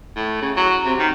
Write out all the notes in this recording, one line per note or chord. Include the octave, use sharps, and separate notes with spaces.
A2
C#3
F#3
C3
D#3